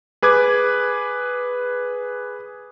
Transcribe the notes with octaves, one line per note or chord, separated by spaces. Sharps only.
G#4 B4 D6 G#6